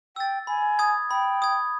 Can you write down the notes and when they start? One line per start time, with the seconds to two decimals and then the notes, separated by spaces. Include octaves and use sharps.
0.16 G5 E6 A6
0.47 G#5 B5
0.79 D#6 G#6
1.10 G5 B5
1.42 D#6 G#6